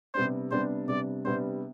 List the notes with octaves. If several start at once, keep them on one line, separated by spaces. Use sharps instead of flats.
C3 G3 B3 D4 C5
C3 G3 B3 D4 C5
C3 G3 B3 D4 D5
C3 G3 B3 D4 C5